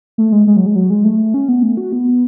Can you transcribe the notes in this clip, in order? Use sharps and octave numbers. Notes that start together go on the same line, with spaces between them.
A3
G#3
G#3
F#3
G#3
F#3
G#3
A3
C#4
B3
A3
F#4
B3